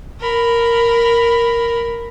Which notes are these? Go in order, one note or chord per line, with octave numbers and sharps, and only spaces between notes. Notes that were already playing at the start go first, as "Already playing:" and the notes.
A#4 B5